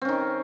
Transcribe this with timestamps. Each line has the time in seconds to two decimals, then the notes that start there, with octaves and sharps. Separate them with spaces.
0.02 C4
0.05 C#4
0.08 D#3